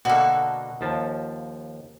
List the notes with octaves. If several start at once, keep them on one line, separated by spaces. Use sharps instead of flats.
B2 D3 A#3 F#4 A4
D#2 F3 A5